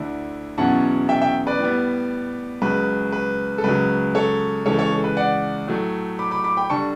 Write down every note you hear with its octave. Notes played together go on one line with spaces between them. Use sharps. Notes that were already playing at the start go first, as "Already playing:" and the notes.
Already playing: D2 D3 A3 E4
E2 B2 F#3 C#4 E4 F#5 A5
E5 G5
E5 G5
B4 D5
A2 G3 B3
C#2 C#3 F#3 B4
B4
A4
C#2 C#3 F#3 B4
A4 C#5
C#2 C#3 E3 A4 C#5
A4 C#5
A4
B4
D5 F#5
A2 F#3 A3
B5 D6
B5 D6
B5 D6
G5 B5
D3 G3 A5 C#6